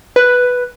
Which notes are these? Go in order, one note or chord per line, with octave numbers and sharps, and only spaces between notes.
B4